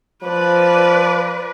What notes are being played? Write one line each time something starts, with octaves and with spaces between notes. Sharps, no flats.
F3 B4 D5